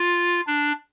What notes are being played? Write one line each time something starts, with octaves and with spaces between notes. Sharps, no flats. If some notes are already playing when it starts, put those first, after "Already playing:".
Already playing: F4
D4